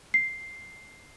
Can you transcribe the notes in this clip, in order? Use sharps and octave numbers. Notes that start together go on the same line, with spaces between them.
C7